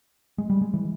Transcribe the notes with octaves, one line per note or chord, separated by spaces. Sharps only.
G#3
G3
G#3
E3